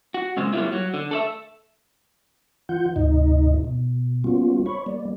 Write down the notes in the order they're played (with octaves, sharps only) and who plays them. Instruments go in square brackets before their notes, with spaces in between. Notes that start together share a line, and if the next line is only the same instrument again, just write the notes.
[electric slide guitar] F#4
A#2 C#3 G#3 C4
F#3 G3 A#3 C#4 E4 F4
F#3
D3
A4 D5 E5
[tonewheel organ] E3 F4 F#5 G6
D2 G#2 C3 D#4 D#5
B2
G3 A#3 B3 C#4 F4 F#4
C#5 B5 C#6
G3 A#3 D5